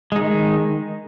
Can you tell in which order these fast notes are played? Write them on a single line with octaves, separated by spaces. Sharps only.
G#3 D#4 D#3